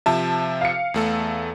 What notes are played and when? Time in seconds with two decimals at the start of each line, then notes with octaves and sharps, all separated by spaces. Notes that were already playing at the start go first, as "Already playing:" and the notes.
0.06 C3 F3 E5 A5
0.61 F5 C#7
0.94 E2 A3 A4